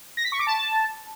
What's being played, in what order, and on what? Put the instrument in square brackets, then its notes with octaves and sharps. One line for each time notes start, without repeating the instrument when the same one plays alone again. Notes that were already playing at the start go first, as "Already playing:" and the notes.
[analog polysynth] A#6
B6
C#6
D6
A5